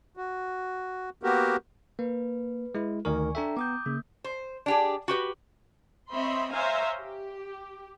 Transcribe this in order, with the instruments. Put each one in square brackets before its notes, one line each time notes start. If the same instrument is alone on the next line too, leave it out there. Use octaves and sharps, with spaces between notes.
[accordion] F#4
A#3 B3 F#4 G4 A#4
[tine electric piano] A#3 [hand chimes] B4
[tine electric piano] G#3 E4
[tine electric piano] D2 D#3 A#4 [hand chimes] D5 G#5 C#6
[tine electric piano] D4 A4 E5 [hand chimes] G5 A#5
[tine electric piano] B3 [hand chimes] D6 D#6 G6
[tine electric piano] C#3 [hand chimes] A#3
[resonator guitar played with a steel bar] C5
D4 G4 G#4
F#4 G4 B4
[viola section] C4 C#5 D#5 E5 B5 C6
C5 C#5 E5 F5 G#5 A#5
G4